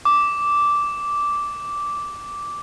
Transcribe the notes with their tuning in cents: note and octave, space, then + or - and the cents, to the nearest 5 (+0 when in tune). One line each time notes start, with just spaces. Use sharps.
D6 -10